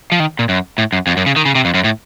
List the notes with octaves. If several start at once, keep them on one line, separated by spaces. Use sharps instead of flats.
F3
D#3
A#2
F#2
A2
F#2
F2
F#2
C#3
D#3
C#3
C3
F2
F#2
A2